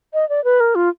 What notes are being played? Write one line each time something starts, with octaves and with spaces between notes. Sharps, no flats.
D#5
D5
B4
A#4
F4